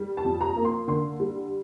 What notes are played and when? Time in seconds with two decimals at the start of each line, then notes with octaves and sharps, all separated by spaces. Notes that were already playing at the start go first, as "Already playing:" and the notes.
Already playing: G3
0.17 A5
0.25 F2
0.41 A#5
0.56 A#3
0.65 C6
0.88 D3 C6
1.20 G3